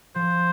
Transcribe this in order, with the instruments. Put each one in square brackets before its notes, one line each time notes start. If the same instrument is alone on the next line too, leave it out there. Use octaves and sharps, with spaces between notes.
[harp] F3 [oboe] C5